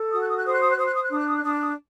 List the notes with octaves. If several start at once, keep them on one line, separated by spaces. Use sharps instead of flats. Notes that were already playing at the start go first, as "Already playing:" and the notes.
Already playing: A4
F#4 D#6
F#6
D#6
F#6
C5 D#6
F#6
D#6
F#6
C5 D#6
F#6
D#6
F#6
D4 D#6
F#6
D#6
F#6
D4 D#6
F#6
D#6